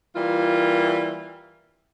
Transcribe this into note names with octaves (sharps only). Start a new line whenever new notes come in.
E3 G3 A#3 F4